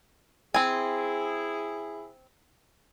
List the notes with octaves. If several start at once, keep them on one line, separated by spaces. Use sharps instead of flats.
C4 E4 G#4 G#5